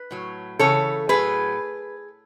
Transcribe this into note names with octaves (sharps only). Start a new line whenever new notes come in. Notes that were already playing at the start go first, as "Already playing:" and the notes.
Already playing: B4
A2 F#3
C#3 E3 A4 C#5
A2 F#3 G#4 B4